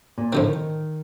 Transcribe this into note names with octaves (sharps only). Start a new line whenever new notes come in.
A#2
A2 D3 F3 C4
D#3